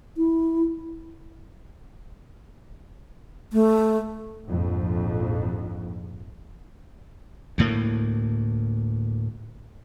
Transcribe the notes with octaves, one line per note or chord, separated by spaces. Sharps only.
E4
A3
A#1 F2 G#2
D2 A2 A#3